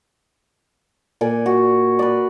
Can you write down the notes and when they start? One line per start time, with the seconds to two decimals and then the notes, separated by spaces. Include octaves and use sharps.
1.21 A#2 D5 G#5
1.46 F#4
1.99 B4 D5